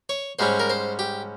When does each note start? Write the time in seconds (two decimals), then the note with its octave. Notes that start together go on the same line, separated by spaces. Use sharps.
0.09 C#5
0.39 G#2 G3 C#4 C5
0.60 A#4
0.70 C5
0.99 G4